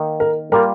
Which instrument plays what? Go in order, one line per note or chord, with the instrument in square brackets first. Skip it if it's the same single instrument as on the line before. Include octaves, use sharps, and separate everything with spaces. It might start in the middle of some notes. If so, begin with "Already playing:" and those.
Already playing: [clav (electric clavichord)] D#3 A#3 D#4
[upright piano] A#4
[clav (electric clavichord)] G3 A#3 F4 [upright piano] A#4